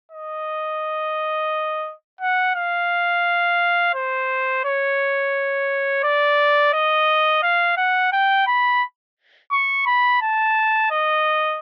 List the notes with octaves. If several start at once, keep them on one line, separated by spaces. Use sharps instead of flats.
D#5
F#5
F5
C5
C#5
D5
D#5
F5
F#5
G5
B5
C#6
B5
A5
D#5